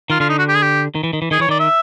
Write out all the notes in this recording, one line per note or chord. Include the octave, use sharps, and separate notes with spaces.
D#3 F4
D3 F4
D#4
F#4
G4
G#4
G4
D#3
E3
D#3
E3
D#3 G#4
E3 C#5
D#3 D5
E5